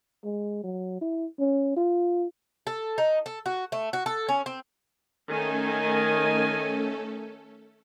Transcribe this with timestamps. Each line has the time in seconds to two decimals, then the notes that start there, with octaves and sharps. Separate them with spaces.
0.24 G#3
0.63 F#3
1.01 E4
1.39 C#4
1.76 F4
2.67 A4
2.98 D#4
3.26 A4
3.46 F#4
3.72 A3
3.93 F#4
4.06 A4
4.29 C#4
4.46 C4
5.30 D#3 A3 C#4 A4 G#5